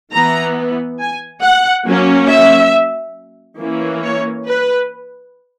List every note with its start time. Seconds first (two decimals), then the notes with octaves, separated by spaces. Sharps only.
0.12 E3 B3 A#5
1.00 G#5
1.43 F#5
1.87 F#3 A#3 C#4
2.30 E5
3.60 E3 A#3 C#4
4.04 C#5
4.48 B4